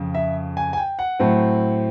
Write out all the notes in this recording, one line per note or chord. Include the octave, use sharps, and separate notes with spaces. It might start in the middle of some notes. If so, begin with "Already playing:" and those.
Already playing: F2 C#3
E5
G#5
G#5
G5
F#5
A2 F#3 A3 C4